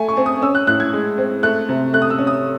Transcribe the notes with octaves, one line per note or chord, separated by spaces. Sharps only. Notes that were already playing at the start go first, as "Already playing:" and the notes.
Already playing: A3 G#5
C#6
C4
D#6
C#4 E6
F#6
A2 F#6
G#6
G#3
C4
A3 F#6
C3
A3 F#6
D#6
E6
C#4
D#6